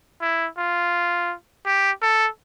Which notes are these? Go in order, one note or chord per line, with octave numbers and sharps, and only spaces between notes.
E4
F4
G4
A4